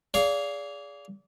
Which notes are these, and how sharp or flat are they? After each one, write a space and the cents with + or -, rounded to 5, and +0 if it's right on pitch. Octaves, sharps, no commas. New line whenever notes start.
G#4 +0 D5 -30 F5 +0